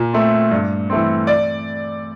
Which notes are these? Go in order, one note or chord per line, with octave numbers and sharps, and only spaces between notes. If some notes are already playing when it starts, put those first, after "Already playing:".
Already playing: A#2
A3 C4
G2
E3 A3 C4
D5